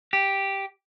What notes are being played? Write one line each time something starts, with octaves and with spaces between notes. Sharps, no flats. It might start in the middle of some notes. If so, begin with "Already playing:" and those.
G4